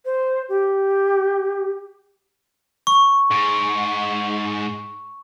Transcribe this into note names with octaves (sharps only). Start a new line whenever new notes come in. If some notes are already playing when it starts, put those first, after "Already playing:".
C5
G4
C#6
G#2